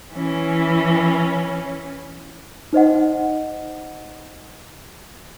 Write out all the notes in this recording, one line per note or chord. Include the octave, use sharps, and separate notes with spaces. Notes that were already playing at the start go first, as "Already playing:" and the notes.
E3 C#4
D#4 C5 D#5 F#5